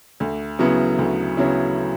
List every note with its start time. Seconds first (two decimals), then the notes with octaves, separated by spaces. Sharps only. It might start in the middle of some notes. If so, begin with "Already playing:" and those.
0.20 D2
0.59 C#3 F#3 B3 E4
0.99 D2
1.37 C#3 F#3 B3 E4